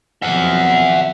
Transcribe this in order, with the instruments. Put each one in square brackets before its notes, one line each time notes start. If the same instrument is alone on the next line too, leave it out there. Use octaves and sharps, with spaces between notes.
[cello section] F2 B2 F#3 [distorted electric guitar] E5 F#5